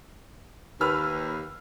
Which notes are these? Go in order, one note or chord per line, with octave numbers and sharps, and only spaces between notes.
D#2 B4 E6 F6